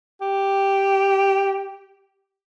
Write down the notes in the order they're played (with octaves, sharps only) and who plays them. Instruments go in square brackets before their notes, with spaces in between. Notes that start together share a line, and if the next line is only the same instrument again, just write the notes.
[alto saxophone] G4